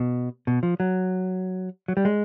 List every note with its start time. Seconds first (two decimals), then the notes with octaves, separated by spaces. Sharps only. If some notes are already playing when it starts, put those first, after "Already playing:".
Already playing: B2
0.47 B2
0.63 F3
0.80 F#3
1.88 F#3
1.97 G3
2.05 G#3